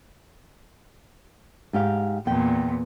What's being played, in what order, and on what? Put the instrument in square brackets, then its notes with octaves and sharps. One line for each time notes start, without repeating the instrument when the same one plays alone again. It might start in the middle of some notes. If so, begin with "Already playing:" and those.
[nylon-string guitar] G#2 G4 F5
[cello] E2 A#2 [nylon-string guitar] G5